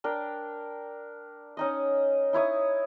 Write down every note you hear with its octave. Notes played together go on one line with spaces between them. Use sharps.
D4 A#4 G5
C#4 D#4 D#5
D#4 E4 C#5 D#6